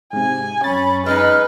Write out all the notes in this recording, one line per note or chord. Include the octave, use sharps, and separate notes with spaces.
G#2 C3 G#5
F#2 C#4 B5 A6
G#3 C#4 D#4 B4 F6